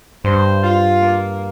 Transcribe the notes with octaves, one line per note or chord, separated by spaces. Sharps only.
G2 C5
F4
A#3